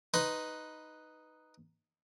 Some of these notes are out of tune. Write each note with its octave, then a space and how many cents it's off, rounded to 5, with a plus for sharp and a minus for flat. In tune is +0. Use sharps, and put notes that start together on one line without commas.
D#4 +0 B4 +5 C6 +0